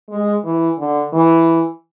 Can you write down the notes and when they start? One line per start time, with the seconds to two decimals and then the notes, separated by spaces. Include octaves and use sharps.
0.09 G#3
0.44 E3
0.79 D3
1.13 E3